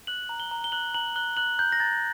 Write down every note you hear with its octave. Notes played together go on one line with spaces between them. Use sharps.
F#6 F#7
A#5
G7
A#5
G7
F#6 F#7
A#5 F#7
F#6 G7
F#6 F#7
A#5 G6
A#6
A#5 A6